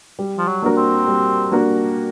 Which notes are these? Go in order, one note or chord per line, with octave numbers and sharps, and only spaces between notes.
G3
F3
F#3
A#3 D4 F#4 A#4
C4
G3
A#3 D4 F#4 A#4